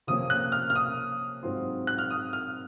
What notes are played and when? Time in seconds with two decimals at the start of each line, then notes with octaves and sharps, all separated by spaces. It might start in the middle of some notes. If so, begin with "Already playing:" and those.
0.07 C3 F3 A#3 C#4 D#6
0.30 F#6
0.52 F6
0.70 F6
0.76 D#6
1.43 G#2 F#3 C4 F4
1.87 F#6
1.98 F6
2.11 D#6
2.33 F6